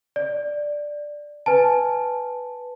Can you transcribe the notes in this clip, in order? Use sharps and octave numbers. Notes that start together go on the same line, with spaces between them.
D5
B4 G#5 A5